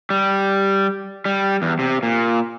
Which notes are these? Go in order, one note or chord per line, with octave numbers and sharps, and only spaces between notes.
G3
G3
E2
C3
A#2